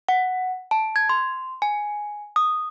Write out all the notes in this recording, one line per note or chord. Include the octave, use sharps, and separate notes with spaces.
F#5
A5
G#6
C6
G#5
D#6